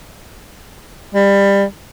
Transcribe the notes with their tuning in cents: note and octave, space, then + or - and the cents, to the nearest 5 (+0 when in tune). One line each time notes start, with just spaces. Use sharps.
G3 +20